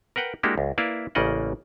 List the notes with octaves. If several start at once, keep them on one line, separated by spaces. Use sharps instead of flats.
A#4 B4 F#5 G5
G#3 A#3 D4 E4 F#4 G4
C#2
A#3 E4 B4 D5 E5 F5
A1 C#3 A#3 D5 D#5 F#5